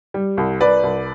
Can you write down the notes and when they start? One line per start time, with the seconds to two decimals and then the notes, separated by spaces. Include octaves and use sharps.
0.14 G3
0.37 C2
0.60 C2 B4 D5
0.83 C2